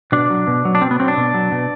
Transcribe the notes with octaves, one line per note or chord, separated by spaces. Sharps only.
B2 D4
F#3
B2
F#3
D4
B2 C4
B3
F#3 C4
D4
B2
F#3
B2